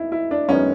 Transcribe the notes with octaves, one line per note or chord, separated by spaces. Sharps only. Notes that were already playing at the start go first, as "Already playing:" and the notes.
Already playing: D#2 D#4 E4
E4
D4
F#2 D#3 G#3 B3 C#4